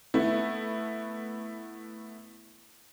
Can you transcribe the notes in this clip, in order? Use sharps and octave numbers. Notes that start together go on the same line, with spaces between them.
A3 B3 E4